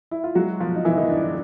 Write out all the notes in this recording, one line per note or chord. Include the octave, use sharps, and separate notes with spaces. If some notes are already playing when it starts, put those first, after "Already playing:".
E4
F4
F#3 G#3 F#4
B2 F3 F4
D#4
B2 E3 E4
D#3 D#4
E2 D4
D4